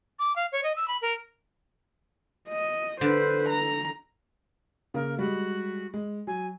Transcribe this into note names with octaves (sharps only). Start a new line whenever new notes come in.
D6
F5
C#5
D#5
E6
B5
A#4
D#5
D3 B4 C5
A#5
C#3 A#3 A#4
G3 G#3 F#4
G#3
F#3 G#5